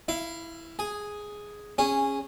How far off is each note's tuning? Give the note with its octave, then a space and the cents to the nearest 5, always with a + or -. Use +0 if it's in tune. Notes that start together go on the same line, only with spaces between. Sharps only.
E4 +0 F5 -25
G#4 +0 G#5 +0
C#4 -10 G#4 -15